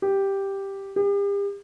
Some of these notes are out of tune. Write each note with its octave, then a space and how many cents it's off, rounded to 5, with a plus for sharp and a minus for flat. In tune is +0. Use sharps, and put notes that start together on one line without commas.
G4 +0
G4 +40